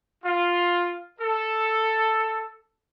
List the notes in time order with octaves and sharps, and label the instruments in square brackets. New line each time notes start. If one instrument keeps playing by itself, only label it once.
[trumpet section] F4
A4